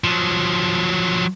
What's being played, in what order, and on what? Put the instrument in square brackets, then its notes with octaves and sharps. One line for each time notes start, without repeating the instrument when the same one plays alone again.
[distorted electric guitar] F3 F#3